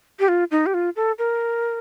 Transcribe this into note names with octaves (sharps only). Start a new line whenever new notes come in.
G4
F4
D#4
G4
F4
A4
A#4